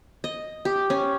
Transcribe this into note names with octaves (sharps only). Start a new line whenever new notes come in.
D#5
G4
C#4